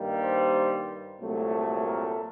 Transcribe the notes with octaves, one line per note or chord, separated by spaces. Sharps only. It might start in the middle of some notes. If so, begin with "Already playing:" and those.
Already playing: G2 D#3 G3 A#3
C5
C2 A#2 F#3 A3
A#4